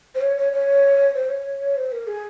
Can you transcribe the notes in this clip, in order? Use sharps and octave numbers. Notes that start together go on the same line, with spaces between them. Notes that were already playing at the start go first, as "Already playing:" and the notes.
C5
C#5
C#5
C#5
C5
C#5
C5
A#4
G#4